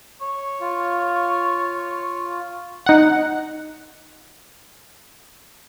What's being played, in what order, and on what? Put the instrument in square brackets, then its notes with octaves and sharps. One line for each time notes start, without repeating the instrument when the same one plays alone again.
[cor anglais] C#5
[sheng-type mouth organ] F4
[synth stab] D#4 F#5